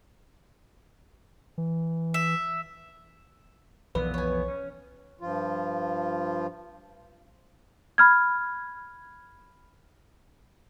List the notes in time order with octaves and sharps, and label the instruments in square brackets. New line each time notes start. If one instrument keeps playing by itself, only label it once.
[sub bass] E3
[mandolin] E5
[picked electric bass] B1 E3 [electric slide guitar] F2 B3 [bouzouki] A#2 [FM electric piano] B4
[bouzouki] C#5 G#5
[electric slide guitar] C#4
[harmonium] G2 F3 F4
[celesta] B5 F6 G#6